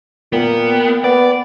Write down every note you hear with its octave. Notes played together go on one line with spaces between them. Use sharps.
A#2 A#3 B3 G5
B3 D5